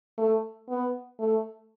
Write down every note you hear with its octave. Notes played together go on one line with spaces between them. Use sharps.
A3
B3
A3